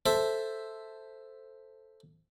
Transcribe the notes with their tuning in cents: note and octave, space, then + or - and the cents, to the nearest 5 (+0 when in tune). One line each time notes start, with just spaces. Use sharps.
A4 +0 C5 +0 E5 +0